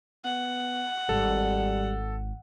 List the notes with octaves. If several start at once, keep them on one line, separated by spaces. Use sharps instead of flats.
B3 F#5
G#1 G3 A4